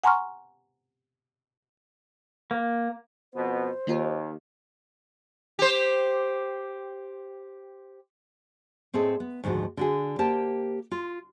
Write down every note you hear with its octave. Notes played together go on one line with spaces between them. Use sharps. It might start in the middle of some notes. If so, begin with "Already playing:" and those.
F#5 G#5 A#5 C6 C#6 F6
A#3
F2 B2 B3 C5
D#2 D#3 A#3 F4
G4 C5
A2 C4 G#4 A4 C5 D#5
B3
D2 G#2 D#3 F3 F#4
D3 F#4 G#4
A#3 G4 A#4 C5 G5 A5
F4